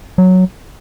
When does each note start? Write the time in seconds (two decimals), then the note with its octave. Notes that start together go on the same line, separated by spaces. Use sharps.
0.18 F#3